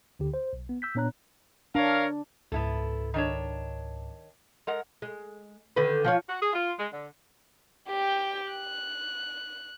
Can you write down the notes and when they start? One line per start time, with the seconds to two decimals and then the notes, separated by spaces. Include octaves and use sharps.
0.19 D2 D3 G4
0.34 C5
0.53 B1
0.69 B3
0.82 E6 G6 B6
0.95 A#2 B3 D4 C#5 A#5 F#6
1.75 D4 A#4 C#5 F5
2.52 C#2 G#2 B3 E4 A4
3.14 D#3 D4 C#5
4.67 G#3 A#4 F#5
5.02 G#3
5.76 D3 D#3 B4
6.04 F3 F4 C#5
6.29 F#4
6.41 G#4
6.53 F4
6.78 G#3
6.92 D3
7.88 G4 G5
8.51 F#6